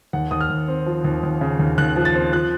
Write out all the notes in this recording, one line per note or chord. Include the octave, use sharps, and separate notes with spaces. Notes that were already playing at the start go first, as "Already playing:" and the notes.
D#2 F#5
D#2 D#6
F6
D#2
C4
F3
D#2
D#2
C#3
D#2
D#2 F#6
F3
A6
C4
F3 F#6